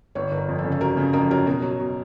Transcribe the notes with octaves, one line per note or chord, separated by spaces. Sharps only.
G1 C#5
G1
A#4
F2
A4
C#3
A4
F#3 A#4
C#3
F2 A#4
F#3 A#4
B2 A#4
F#3
B2